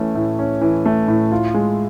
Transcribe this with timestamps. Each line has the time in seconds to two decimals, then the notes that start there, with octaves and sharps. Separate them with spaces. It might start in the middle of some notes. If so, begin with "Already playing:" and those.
Already playing: E3 A3 C#4
0.15 A2
0.39 C#4
0.61 E3
0.86 A3
1.08 A2
1.32 F4
1.54 G#3